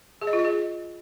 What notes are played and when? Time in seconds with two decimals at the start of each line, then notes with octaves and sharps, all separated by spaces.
0.21 G#4
0.27 D#5
0.33 F4
0.39 D#5
0.45 G#4